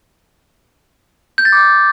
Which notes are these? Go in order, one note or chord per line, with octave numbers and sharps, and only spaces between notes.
G6
A6
D6